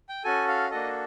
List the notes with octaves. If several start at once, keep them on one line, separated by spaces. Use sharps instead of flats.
G5
C#4 F#4 A4 G#5
F5
A#3 D4 F#4 A4 D#5